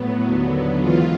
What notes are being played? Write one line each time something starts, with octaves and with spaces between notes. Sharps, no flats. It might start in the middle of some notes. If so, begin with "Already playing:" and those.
Already playing: A2 F#3 B3
D#2 D3 F#3
G#2 E3 F4